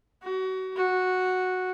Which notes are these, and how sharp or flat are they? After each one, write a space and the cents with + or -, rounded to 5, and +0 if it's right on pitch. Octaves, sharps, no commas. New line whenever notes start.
F#4 +30
F#4 -5